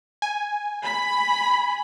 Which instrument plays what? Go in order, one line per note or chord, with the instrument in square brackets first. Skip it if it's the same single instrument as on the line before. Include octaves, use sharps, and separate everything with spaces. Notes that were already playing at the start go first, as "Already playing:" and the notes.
[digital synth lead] G#5
[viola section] B5